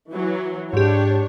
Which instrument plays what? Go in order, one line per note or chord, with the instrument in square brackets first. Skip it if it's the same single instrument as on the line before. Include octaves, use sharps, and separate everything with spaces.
[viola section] E3 F#3
[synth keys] G#2 G4 [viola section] D4 C#5